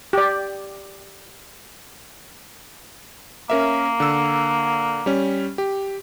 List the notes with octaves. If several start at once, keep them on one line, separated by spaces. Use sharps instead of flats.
G4 D5
A#3 C#4 A#4 E5
D3 E6
G3 C#4
G4